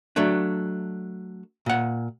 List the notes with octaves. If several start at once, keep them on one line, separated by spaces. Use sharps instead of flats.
F#3 A3 D4
A#2 F#5